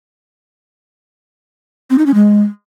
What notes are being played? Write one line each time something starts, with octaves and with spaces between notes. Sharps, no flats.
C4
D#4
C#4
G#3